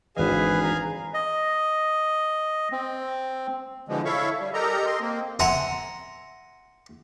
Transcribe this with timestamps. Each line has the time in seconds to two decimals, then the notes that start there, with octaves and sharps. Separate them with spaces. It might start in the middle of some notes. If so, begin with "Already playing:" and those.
0.17 G#1 D3 E3 G#4 B4 D#5 F5 G#5
0.63 A#5
1.14 D#5
2.72 C4
3.89 B2 D3 E3 F3 G#3
4.05 E4 A4 C#5 E5 F5 C#6
4.40 G3
4.54 G4 A4 A#4 D#5 A#5
4.86 D#5 C6
5.01 A#3 C4
5.40 E5 F#5 G#5 A#5 C6